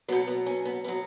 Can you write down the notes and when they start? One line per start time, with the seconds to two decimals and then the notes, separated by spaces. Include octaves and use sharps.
0.08 F#3 B3
0.12 B2
0.27 B3
0.46 C#4
0.65 B3
0.84 B2 F#3 B3